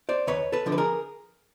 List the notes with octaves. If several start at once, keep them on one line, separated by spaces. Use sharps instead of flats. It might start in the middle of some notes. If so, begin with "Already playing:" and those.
C5 D5
D#2 B4 C#5
A4 B4
D3 F3
B4
G#4 A#4